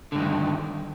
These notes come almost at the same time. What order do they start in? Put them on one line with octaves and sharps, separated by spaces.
D3 G2 D#3